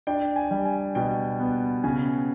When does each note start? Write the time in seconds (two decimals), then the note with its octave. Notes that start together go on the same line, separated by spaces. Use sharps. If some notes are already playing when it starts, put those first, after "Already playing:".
0.07 D4 G5
0.36 G#5
0.51 G3
0.65 G#5
0.95 B2 G5
1.40 B3
1.84 C#3 G#5